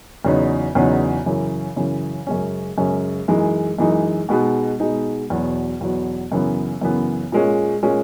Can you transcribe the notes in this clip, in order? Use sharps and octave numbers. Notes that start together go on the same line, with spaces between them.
E2 C#3 F#3 B3 D#4
E2 C#3 F#3 B3 D#4
F#2 C#3 E3
F#2 C#3 E3
F#2 C#3 G#3 C#4
F#2 C#3 G#3 C#4
F#2 E3 G#3 D#4
F#2 E3 G#3 D#4
B2 G#3 B3 D#4
B2 G#3 B3 D#4
E2 B2 F#3 B3
E2 B2 F#3 B3
F#2 C#3 E3 B3
F#2 C#3 E3 B3
A#2 G#3 C#4
A#2 G#3 C#4